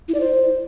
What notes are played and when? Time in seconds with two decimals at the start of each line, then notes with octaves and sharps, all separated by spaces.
0.08 E4
0.14 D5
0.20 C5